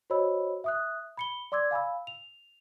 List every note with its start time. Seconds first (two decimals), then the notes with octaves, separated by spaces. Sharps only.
0.10 F#4 C5 C#5 D#5 B5 E6
0.64 E5 D#6 F#6
1.17 B5 C#7 G7
1.52 D5 C6 D6 E6 G#6
1.71 F5 G#5 B5 E6
2.07 F7